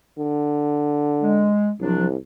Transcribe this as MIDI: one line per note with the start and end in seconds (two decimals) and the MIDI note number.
0.18 1.53 50
1.22 1.71 56
1.80 2.16 36
1.80 2.06 53
1.80 2.06 54
1.80 2.06 62